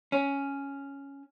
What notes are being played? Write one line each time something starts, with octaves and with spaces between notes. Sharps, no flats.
C#4